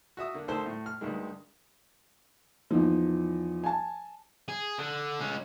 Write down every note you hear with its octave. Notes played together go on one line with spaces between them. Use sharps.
F#4 E5 D#6
D3 A#3
D2 D#3 A4 C5 A5 C6
A2
F6
D2 G2 D#3 G#3
E2 D#3 F3
G#5 A5
G#4
D3
G#3 C#4